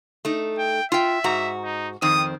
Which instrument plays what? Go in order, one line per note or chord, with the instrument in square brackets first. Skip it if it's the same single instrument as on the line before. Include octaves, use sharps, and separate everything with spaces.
[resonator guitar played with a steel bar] A3 D#4
[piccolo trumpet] G5
[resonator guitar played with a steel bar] F4 G5 [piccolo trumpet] E5
[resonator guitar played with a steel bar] G#2 F#4 A#5
[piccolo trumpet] D#4
[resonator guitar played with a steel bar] F2 D#3 C4 [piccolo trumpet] D#6